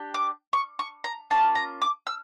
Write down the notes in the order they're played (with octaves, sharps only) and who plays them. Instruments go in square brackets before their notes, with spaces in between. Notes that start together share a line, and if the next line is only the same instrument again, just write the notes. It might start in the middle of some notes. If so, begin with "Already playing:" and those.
Already playing: [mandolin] D4 G4
D6
C#6
C#6
A#5
A#3 C#4 F4 A5
A#5
D6
E6